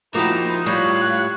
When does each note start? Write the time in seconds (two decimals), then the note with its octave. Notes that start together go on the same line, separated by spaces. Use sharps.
0.15 F3 A#3 D#4 E4 F#4 G4
0.66 A2 G3 F4 C#5 F#6